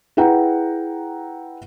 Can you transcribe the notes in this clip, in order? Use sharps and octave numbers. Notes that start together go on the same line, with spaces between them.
E4 G#4 B4 F#5 G5 A#5